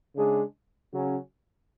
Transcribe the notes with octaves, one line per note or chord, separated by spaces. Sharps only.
C#3 G#3 D4 G#4
C#3 F#3 C#4